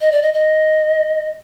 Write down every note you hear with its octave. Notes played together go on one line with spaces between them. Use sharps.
D#5
D5
D#5
D#5